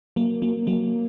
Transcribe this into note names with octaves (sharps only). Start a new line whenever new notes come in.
F#3 A#3
F#3 A#3
F#3 A#3